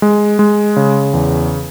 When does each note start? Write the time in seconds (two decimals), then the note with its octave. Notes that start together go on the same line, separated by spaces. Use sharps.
0.02 G#3
0.39 G#3
0.76 C#3
1.14 E2